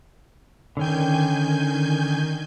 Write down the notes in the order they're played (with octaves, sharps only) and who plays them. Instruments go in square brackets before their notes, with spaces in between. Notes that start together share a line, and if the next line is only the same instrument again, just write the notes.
[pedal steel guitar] D3 C#4 G5 [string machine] D#3 G#5 G6